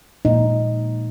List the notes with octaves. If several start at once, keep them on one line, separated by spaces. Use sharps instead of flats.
A#2 G#3 D#4